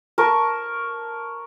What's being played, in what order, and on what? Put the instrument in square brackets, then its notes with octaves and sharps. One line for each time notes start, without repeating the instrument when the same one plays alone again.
[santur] A#4 A5 C#6